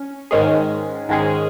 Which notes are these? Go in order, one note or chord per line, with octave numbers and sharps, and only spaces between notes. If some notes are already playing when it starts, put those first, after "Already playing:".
Already playing: C#4
G#2 D#3 G#3 C#4 G#4
G#2 D#3 G#3 C#4 G#4